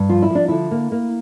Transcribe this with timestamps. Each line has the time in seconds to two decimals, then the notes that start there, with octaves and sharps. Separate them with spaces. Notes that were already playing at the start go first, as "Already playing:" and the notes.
Already playing: G2
0.09 F3 F4
0.22 E4
0.30 F3 D4
0.48 D3 E4
0.71 A#3
0.92 A#3